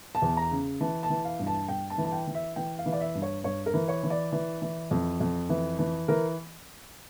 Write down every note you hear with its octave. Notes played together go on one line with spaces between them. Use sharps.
A5
E2
A#5
C#3
E3 A5
A5
E3
F5
G2
A5
G2 G5
A5
E3
A5
G5
E3
E5
E3 G5
F5
E3
D5
E5
G2
C#5
G2 C#5
A#4
E3
C#5
E3
D5
E3
E3
F2
F2
E3
E3
E3 A#4